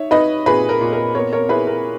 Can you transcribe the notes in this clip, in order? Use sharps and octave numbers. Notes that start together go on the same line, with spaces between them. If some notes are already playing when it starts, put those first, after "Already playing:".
Already playing: D#4 C#5 E5
D#4 B4 D#5
A#2 G#4 B4
A#4
A#2
A#4
B3 A#4 C#5
A#4 C#5
E4 G#4 B4
A#4